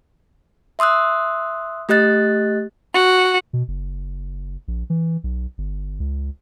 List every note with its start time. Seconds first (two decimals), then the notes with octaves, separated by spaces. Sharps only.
0.79 E5 C6 D#6 E6 F#6
1.89 A3 G4 D#5 F#6 A6
2.93 F#4
3.53 B2
3.68 F#1
4.68 A#1
4.90 E3
5.24 B1
5.58 G1
6.00 C#2